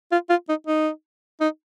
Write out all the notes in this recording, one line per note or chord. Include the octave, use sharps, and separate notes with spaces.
F4
F4
D#4
D#4
D#4